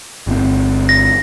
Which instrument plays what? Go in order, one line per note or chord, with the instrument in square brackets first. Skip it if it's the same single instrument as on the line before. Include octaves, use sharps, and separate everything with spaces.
[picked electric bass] G1 C4
[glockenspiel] A#6